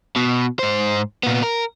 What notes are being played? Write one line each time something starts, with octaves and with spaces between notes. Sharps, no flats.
B2
G#2 C5
A#2 B3
A#4